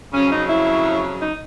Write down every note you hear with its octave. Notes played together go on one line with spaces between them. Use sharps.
F2 C#3 F#3 C#4
D#4
E4
D#4